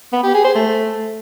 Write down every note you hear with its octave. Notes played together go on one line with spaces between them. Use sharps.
B3
G4
G#4
C5
A3